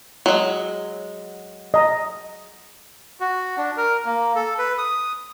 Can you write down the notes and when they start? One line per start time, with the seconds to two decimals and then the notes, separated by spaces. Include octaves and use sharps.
0.26 F#3 G#3
1.74 D#5 A#5
3.20 F#4
3.58 D4
3.77 A#4
4.06 A#3
4.35 A4
4.59 B4
4.78 D#6